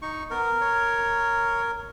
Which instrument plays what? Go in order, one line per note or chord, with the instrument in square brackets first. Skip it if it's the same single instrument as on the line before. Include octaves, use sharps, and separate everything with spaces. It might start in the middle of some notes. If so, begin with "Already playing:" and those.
[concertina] D#4 C#6
[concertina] B3 [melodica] A#4
[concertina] C#5